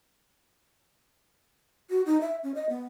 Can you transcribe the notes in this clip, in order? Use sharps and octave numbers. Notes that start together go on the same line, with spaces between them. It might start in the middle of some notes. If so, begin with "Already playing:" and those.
F#4
D#4
E5
C#4
D#5
B3